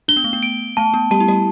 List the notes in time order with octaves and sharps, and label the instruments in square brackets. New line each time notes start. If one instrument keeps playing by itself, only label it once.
[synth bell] D4 [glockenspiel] G7
[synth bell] B3
A3
B3
[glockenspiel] D7
[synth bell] A3 [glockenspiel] A5
[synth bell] B3
[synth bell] G3 G4 [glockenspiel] A5
[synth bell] E4
G3 G4